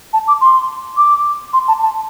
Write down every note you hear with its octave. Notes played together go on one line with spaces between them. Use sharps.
A5
D6
C6
D6
C6
A5
A5